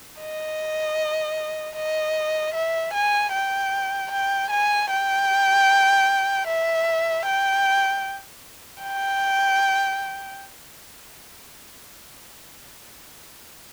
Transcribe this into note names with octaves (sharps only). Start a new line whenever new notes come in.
D#5
D#5
E5
G#5
G5
G5
G#5
G5
E5
G5
G5